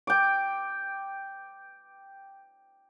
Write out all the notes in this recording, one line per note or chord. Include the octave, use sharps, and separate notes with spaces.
G5 D6